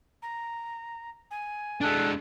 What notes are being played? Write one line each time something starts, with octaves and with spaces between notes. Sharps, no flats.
A#5
G#5
G#3 D4 A4 F#6